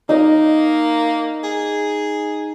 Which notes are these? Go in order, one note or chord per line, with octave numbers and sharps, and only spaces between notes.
A#3 D#4 D#5
G#4